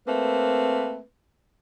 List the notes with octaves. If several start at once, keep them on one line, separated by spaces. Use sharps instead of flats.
A3 A#3 C4 B4